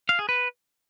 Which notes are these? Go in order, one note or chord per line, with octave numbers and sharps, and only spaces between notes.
F5
G#4
B4